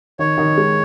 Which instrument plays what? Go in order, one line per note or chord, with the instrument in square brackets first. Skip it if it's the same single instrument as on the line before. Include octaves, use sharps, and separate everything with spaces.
[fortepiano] D#3 [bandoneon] C#5
[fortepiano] D#3
G#3